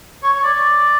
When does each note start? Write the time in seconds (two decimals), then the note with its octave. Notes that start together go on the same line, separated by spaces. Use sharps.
0.23 C#5
0.33 C#5
0.43 D5
0.53 D5